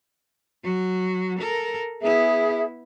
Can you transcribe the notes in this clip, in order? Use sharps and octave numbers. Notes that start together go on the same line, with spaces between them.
F#3 F#4
A4 A#4
B3 E4 G#4 E5